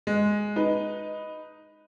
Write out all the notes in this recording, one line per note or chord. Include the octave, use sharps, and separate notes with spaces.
G#3
D#4 B4